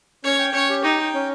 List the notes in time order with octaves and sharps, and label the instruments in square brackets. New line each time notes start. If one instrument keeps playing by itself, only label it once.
[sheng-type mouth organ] C#4 [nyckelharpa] C#5
[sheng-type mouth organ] G5
[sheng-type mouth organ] C#4 [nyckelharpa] C#5
[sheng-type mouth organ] G4
[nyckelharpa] D#4 [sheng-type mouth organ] G5
[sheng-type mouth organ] G5
C#4